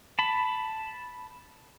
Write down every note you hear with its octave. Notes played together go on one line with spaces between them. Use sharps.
A5 B5